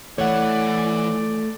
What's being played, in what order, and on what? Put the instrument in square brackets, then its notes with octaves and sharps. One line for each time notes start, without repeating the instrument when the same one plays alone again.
[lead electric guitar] E3 [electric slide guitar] A3 [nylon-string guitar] C#5 F#5 [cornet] D5